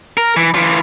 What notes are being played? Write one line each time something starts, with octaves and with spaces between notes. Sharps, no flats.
A#4
E3
E3 F4